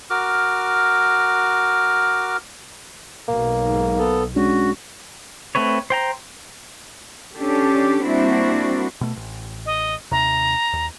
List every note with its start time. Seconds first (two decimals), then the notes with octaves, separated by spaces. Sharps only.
0.10 F#4 A#4 D6 F6
3.29 B1 A#3
3.62 G#2
3.98 B3 A4
4.36 G#3 C#4 D4 F#4
5.55 A3 C4 B4 C#5
5.90 C5 G5 A#5
7.34 C#4 D4 G4 A4
8.04 G3 A#3 C4 D4 E4 F#4
9.01 B2 A3
9.16 A1
9.66 D#5
10.12 D#2 C3 A#5
10.73 D#2